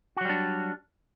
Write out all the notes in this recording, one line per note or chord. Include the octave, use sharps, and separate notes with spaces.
F#3 G3 D4 F#4